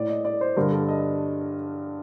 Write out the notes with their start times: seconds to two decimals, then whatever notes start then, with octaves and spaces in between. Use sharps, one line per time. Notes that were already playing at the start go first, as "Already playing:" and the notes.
Already playing: A2 D5
0.09 D#5
0.25 D5
0.41 C5
0.57 G2 D3 A#4
0.72 A4
0.88 D#5